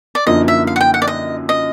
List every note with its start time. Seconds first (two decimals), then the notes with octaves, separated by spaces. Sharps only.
0.15 D5
0.27 F#2 D3 F3 A#3 D#4 D#5
0.48 E5
0.67 F5
0.76 F#5
0.80 G5
0.94 F#5
1.02 D5
1.08 D#5
1.49 D#5